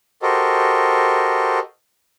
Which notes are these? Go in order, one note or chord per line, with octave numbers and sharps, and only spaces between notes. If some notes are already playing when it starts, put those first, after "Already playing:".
F#4 G4 A4 A#4 C5 D#5